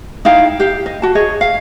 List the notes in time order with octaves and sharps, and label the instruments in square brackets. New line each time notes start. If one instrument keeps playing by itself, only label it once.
[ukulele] D#4 E4 F5 G5
G4 F5
D#5
F#4 A5
G#4 C#5 D#5
F5